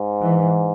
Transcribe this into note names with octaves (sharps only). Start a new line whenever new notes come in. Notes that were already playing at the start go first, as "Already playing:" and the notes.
Already playing: G#2
E3